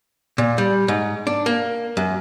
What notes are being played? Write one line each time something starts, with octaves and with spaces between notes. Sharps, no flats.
A#2
G3
G#2
D4
A#3
F#2